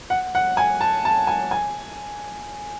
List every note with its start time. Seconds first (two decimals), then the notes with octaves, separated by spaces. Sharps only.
0.10 F#5
0.35 F#5
0.57 G#5
0.81 A5
1.05 A5
1.27 G#5
1.51 G#5